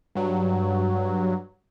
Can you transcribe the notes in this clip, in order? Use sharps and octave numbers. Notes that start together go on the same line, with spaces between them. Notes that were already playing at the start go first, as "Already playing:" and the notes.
G2 F#3